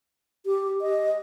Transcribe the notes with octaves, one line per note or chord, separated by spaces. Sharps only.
G4
D#5